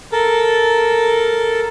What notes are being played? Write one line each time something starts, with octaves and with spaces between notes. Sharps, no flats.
A4 A#4